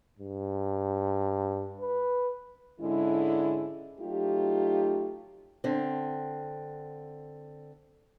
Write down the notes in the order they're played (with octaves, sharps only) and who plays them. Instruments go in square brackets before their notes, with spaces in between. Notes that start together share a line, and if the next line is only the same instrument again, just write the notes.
[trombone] G2
B4
[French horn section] G#2 D3 G#3 C#4 E4
F#3 A3 D#4 F4 G4
[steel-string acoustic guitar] D3 C4